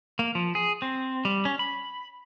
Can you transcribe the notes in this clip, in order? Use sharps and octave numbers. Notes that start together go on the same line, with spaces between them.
A#3
F3
G#4
C4
G3
C#4
B5